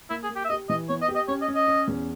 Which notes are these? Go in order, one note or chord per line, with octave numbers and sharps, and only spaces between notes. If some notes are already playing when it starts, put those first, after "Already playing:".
A#3 E4
G#4
A#3
G4
E5
G4 D#5
E3 D#5
B3 C#5
D#5
G4
D#5
C#4 C#5
D#5
C#4
D#5
C#4
E2